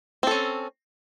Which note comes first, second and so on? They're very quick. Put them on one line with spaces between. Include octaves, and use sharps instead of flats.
C4 A4 C#4